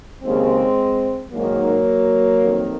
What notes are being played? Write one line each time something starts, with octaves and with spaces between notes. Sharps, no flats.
D#2 C#3 G#3 C4
G#2 D#3 F#3 A#3
F2 D#3